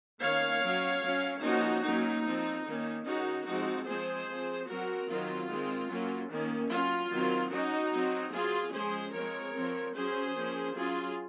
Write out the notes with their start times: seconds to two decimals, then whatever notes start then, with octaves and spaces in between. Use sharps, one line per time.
0.22 D#3 A#3 C#4 C#5 F5
0.63 F#3 C#4
1.04 F#3 C#4
1.43 F3 A#3 C#4 D#4 F#4
1.84 F#3 A#3 C#4 D#4
2.25 F3 C4
2.66 D#3 A#3 C#4
3.05 D#3 G#3 C#4 D#4 F#4
3.46 F3 G#3 C4 D#4 F#4
3.86 F3 G#3 C4 G#4 C5
4.28 F3 C4
4.68 F#3 C4 F#4 A#4
5.09 D#3 F#3 C4 F4
5.49 D#3 G#3 C4
5.89 F#3 A#3 C#4
6.29 D#3 A#3 C#4
6.70 F#3 C#4 F4
7.11 D#3 F#3 C4
7.51 F#3 C#4 D#4 F#4
7.91 F#3 C4
8.32 F#3 C4 F4 G#4
8.73 F3 G#3 C#4 G#4 C5
9.13 F3 G#3 C4 A#4 C#5
9.53 F3 C4
9.94 F#3 C#4 G#4 C5
10.35 F3 A#3 C#4
10.75 F#3 C#4 F4 G#4